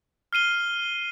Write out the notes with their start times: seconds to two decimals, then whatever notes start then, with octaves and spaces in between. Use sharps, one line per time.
0.33 F6 C7 D#7 G7